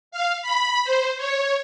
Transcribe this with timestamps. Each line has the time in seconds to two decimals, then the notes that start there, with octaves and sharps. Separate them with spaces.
0.12 F5
0.42 B5
0.84 C5
1.17 C#5